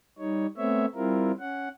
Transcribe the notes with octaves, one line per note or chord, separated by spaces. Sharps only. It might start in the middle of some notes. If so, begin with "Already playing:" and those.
G3 D#4 C#5
A3 B3 C4 C#5 E5
G3 C4 E4 F4 A#4
C#4 F#5